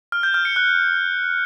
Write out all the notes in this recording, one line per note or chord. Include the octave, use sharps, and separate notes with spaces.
F6
G6
F6
C#7
F#6